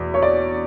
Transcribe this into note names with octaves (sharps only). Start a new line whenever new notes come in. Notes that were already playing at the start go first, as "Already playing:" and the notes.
Already playing: E2 B2
C#5
D5